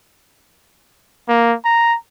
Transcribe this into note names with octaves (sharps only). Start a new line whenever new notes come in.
A#3
A#5